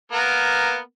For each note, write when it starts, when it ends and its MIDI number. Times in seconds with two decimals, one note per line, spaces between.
0.12 0.79 58
0.12 0.79 59
0.12 0.79 70